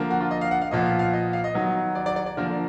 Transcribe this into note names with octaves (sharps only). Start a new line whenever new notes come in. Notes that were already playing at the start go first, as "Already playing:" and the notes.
Already playing: D3 F3 A#3
F#4
F4
D#5
F5
F#5
F5
A#2 F3 B3 D#5
F5
F5
D#5
F5
D#5
D#3 F#3 B3
D5
D5
D5
D5
D3 F3 A#3 A#4